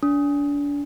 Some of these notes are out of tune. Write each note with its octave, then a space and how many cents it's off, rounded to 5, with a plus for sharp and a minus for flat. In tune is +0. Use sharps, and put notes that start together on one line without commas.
D4 -35